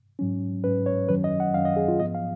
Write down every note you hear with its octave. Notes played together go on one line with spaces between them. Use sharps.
G#2 F#3 C#4
G#2 F#3 C#4 B4
C#5
F#2 D#3 F#3 C#4 B4
D#5
F#5
F#2 D#3 F#3 C#4 F5
D#5
G#4
F4
G#2 F3 B3 D#5
F5